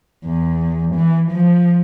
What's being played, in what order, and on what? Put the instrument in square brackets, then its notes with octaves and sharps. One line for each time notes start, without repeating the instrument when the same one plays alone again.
[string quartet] E2
E3
F3